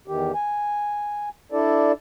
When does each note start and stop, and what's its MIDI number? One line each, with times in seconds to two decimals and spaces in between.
0.08 0.32 40
0.08 0.32 51
0.08 0.32 67
0.34 1.29 80
1.52 1.92 62
1.52 1.92 64
1.52 1.92 69
1.52 1.92 74